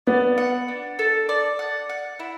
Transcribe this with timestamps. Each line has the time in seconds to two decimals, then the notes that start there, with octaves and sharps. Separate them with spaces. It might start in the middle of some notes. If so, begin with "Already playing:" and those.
0.07 B3 D5
0.38 F#5
0.68 D4
0.99 A4
1.29 D5
1.59 F#5
1.89 F#5
2.19 E4